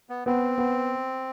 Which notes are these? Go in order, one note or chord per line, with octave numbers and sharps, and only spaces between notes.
B3
B3 C4
B3